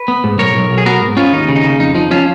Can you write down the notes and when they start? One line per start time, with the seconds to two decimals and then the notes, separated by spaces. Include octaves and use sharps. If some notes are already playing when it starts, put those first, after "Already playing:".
Already playing: B4
0.08 B3
0.24 G#2
0.39 B1 A#4 C#5
0.55 B1
0.70 B1
0.78 G#4
0.86 B3 F#4 A#4
1.02 G#2
1.17 B3 C#4 F4
1.32 D#2 D#4
1.48 C#3
1.56 D#4
1.64 C#3
1.80 F2 D#4
1.95 F3 D#4
2.11 F3 C#4 F4